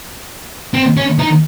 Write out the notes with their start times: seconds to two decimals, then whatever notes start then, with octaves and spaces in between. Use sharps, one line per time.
0.74 C4
0.97 C#4
1.19 D#4